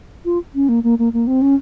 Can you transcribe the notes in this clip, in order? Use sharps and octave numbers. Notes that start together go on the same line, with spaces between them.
F4
C#4
A#3
A#3
A#3
A#3
C4
C#4